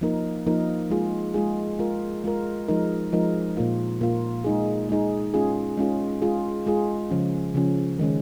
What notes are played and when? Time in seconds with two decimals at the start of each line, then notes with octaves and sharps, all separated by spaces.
0.01 F3 A#3 D#4 A#4
0.47 F3 A#3 D#4 A#4
0.90 G#3 F4 G#4
1.34 G#3 F4 G#4
1.79 G#3 F4 A#4
2.24 G#3 F4 A#4
2.68 F3 G#3 D#4 A#4
3.13 F3 G#3 D#4 A#4
3.57 A#2 A#3 F4
4.01 A#2 A#3 F4
4.44 G#3 D#4 G#4
4.89 G#3 D#4 G#4
5.34 G#3 C#4 F4 G#4
5.77 G#3 C#4 F4 G#4
6.22 G#3 F4 G#4
6.66 G#3 F4 G#4
7.10 C#3 F3 C#4
7.55 C#3 F3 C#4
7.99 D#3 G#3 C#4